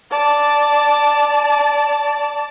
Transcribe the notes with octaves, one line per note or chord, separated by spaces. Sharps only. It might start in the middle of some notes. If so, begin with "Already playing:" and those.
D5 A5